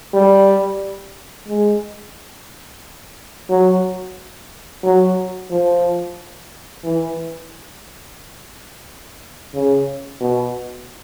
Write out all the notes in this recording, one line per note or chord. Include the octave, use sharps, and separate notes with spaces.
G3
G#3
F#3
F#3
F3
E3
C#3
B2